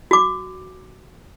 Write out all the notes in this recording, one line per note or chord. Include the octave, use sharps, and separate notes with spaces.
F#4 D6